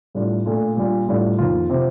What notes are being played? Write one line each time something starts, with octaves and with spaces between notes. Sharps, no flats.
A2 G3 D4 F4
A#2 A3 D4 F4
A#2 G3 D4 F4
A2 G3 D4 F4
F2 D#3 A#3 F4
C3 F3 C4